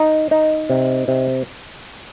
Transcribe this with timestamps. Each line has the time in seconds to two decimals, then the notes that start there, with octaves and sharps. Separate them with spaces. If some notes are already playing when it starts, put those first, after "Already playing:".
Already playing: D#4
0.31 D#4
0.70 C3
1.08 C3